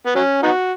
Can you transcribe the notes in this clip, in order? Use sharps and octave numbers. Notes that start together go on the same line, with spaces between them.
B3
F#3 C#4
B3 D#4 F#4